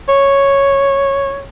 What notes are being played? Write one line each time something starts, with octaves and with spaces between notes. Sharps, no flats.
C#5